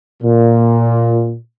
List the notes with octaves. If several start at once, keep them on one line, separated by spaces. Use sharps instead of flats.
A#2